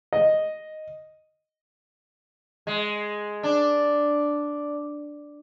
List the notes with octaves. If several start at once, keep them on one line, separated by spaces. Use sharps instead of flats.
D#5
G#3
D4